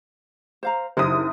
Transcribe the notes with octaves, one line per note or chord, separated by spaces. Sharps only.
C5 F5 A#5
F#1 D#4 E4 C5 D#6